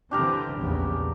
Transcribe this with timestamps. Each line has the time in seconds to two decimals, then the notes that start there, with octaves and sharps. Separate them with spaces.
0.11 D3 E3 C4 D4 G4 A#4
0.57 A#1 E2 C#3